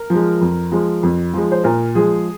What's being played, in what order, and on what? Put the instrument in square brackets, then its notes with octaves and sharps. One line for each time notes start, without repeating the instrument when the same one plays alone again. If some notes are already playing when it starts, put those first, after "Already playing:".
Already playing: [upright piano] A#4
F3
G#3
F2
F3 G#3
F2
F3 G#3
C5
A#2 A#4
F3 G#3 G#4